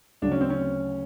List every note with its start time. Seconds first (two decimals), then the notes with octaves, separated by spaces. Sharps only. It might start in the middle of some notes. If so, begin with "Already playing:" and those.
0.22 D2 C#3 F#3 D4
0.31 C#4
0.41 C4
0.50 C#4